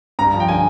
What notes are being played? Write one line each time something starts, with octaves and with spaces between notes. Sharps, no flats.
G2 A#5
F3
G5
D3 G#5